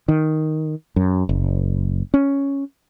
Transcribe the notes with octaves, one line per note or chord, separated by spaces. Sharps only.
D#3
F#2
F#1
C#4